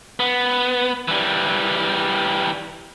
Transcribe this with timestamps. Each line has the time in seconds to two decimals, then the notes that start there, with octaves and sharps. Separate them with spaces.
0.20 B3
1.08 E3 G3